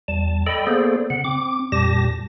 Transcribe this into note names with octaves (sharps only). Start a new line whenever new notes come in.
E2 G3 A5
A4 D5 D#5 G5 B5
A#3 B3 G#4 A4 C5 D5
C#3 F#5
C4 D6
F2 A#2 G3 G4 A5 A#6